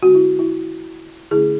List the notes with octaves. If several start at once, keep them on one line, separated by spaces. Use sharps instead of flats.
D3 G#3 C#4 F#4
E4
E4
D3 A3 C#4 E4 G#4